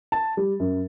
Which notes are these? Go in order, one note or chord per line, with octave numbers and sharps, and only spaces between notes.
A5
G3
F#2